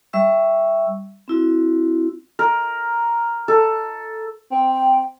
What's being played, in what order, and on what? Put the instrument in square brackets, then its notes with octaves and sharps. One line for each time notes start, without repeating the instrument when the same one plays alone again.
[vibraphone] G3 E5 C#6 E6
C4 E4 F#4
[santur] A#4
A4
[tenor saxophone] C4
[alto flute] G5